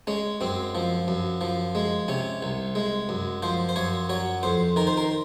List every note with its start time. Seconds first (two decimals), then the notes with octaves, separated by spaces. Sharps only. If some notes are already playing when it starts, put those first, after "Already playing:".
0.07 G#3 C#4
0.41 F#2 C4
0.75 F3
1.08 F#2
1.41 F3
1.75 G#3
2.08 C3 C#4
2.43 C2
2.75 G#3
3.09 F#2
3.43 F3 C5
3.69 C5
3.76 F#2 C#5
4.09 F#3 C#5
4.43 F2 C5
4.76 D#3 A#4
4.87 C5
4.97 A#4